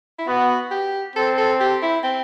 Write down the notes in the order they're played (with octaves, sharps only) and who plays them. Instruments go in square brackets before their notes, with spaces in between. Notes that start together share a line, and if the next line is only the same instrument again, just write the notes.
[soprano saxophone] E4
[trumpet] B3 [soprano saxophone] F#4
[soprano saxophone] G4
[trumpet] C4 [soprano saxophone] A4
[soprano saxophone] A4
G4
E4
C4